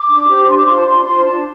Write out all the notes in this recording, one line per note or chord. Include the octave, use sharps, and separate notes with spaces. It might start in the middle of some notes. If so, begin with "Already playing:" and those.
Already playing: D6
D4
G4 C5
D4 C6
D6
F4 C5 C6
A5
D4 C6
F4 C5 C6
D4 A5